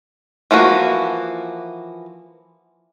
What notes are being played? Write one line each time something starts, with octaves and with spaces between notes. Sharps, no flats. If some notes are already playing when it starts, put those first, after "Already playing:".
E3 F3 A#3 F#4